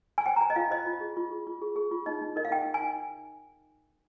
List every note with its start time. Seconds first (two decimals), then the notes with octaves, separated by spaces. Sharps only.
0.18 G#5
0.26 C5 G5
0.36 A#5
0.41 C5 G#5
0.50 D#5
0.56 F4 F5
0.71 C5 D#5
0.86 F4
1.01 G#4
1.17 F4
1.31 G#4
1.47 F4
1.62 G#4
1.76 G#4
1.91 F4
2.06 D#4 D#5
2.21 D#4
2.36 A#4 D#5
2.45 F5
2.51 D#4 G5
2.66 D#4
2.74 G#5
2.82 D#4